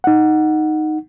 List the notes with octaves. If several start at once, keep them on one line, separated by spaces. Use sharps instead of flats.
D#4 F#5